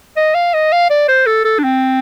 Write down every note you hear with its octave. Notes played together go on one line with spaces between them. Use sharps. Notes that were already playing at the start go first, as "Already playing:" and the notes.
D#5
F5
D#5
F5
D5
C5
A4
A4
D4
C4